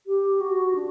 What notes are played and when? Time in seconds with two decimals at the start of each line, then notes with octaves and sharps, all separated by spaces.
0.07 G4
0.40 F#4
0.75 D4